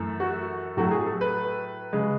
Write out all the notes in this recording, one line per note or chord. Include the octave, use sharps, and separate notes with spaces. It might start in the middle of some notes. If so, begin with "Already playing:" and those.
Already playing: F#2 E3 A3
F#4
A2 F#3 A3 F#4
G#4
A4
B4
C#3 G#3